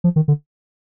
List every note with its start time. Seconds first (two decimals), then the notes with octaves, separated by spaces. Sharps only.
0.04 F3
0.16 D#3
0.28 D3